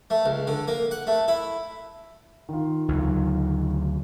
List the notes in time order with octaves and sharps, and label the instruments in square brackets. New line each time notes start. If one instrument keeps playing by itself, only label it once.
[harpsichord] A3
C#2
D3
A#3
F#5
A3
E4
[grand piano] D#3 F4
[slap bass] D2 C#3 F#3